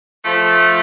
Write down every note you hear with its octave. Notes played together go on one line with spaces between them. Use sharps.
F3 A3